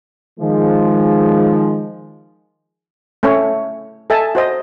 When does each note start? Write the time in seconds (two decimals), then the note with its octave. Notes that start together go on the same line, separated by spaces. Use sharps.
0.40 D#3 F3 G#3
3.23 A3 C#4 C#5
4.10 A4 D#5 E5 G#5 A5
4.35 F#4 C5 D#5